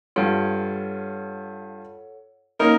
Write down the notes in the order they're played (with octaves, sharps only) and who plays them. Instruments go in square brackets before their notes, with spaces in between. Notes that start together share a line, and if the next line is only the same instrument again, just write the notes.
[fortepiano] G2 F4 [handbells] A4 C#5 F#5
[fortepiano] A#3 C#4 D#4 [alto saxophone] A#4